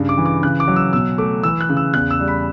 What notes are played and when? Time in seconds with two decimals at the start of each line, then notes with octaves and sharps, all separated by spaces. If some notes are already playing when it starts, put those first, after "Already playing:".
Already playing: G2 C#3
0.09 D6
0.18 E3
0.26 D6
0.43 C#3 F#6
0.60 D6
0.68 F#3
0.76 E6
0.93 B2 E6
1.18 A3 D6
1.43 E3 E6
1.61 F#6
1.69 C#3
1.77 E6
1.94 E2 F#6
2.11 E6
2.20 G3
2.28 B5